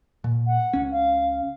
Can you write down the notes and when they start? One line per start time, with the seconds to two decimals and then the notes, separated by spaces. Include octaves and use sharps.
0.24 A#2
0.46 F#5
0.73 C#2 C#4
0.91 F5